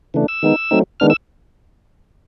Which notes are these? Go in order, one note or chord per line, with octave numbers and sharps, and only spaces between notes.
C#3 E3 A3 D4
E6
D#3 G#3 B3 D#4
F#3 A3 C4 D#4
D#3 G#3 B3 D4 F6
E6